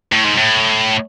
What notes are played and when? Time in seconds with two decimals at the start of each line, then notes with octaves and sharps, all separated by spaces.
0.12 A2
0.24 G#2
0.37 A2